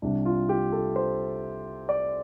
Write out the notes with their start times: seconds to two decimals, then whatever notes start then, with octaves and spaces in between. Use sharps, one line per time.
0.02 C2 C3 G3 D4
0.26 F4
0.49 G4
0.72 A4
0.96 C5
1.89 D5